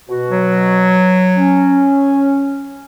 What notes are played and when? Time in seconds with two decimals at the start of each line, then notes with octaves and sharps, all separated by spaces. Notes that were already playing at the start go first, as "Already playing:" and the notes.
0.09 B2 F#4
0.31 F#3
1.37 C#4